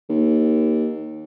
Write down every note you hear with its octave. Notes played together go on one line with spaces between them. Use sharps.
D#2